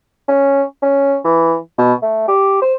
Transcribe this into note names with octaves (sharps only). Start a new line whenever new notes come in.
C#4
C#4
E3
B2
A3
G4
C5